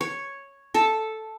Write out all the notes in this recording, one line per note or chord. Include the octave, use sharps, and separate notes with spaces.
C#5
A4 A5